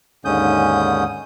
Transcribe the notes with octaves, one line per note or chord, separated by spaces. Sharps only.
D#2 G#2 D3 C#4 D#6 G6